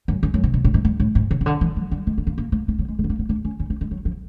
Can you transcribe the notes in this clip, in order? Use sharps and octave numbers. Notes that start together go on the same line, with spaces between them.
F#2
F#2
F#2
C3
B2
A2
G#2
G2
A2
G#2
C#3
C#3
D3
E3
F#3
G3
G#3
A3
A#3
A#3
A#3
C4
F#3
G#3
A3
B3
A#3
B3
D4
C#4
C#4
C4
G#3
F#3
F3